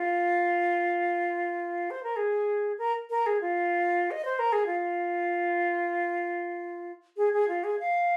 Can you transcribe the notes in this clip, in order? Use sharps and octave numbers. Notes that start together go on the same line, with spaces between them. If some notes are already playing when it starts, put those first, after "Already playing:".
Already playing: F4
C5
A#4
G#4
A#4
A#4
G#4
F4
D#5
C5
A#4
G#4
F4
G#4
G#4
F4
G#4
F5